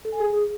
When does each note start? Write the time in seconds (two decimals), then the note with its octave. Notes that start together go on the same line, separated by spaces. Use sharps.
0.05 A4
0.12 G#5
0.20 G#4